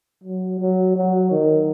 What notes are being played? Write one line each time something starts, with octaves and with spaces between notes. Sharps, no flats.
F#3
F#3
F#3
D#3